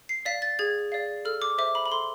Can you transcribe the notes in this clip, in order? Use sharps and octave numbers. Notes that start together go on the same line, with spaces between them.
C7
D5 F5 B6
A6
G#4 G#6
D5 F5
A4 F6
D6
C5 E5 D6
B5
B5
A4 C6